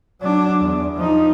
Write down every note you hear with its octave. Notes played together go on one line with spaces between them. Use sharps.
F#3 D4
E2
F3 D#4